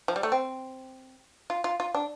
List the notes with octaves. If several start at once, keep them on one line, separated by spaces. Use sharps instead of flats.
F3
G3
A3
C4
F4
F4
F4
D4